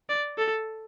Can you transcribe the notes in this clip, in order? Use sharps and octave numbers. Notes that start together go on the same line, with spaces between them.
D5
A4